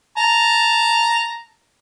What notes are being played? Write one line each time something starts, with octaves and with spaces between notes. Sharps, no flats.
A5 A#5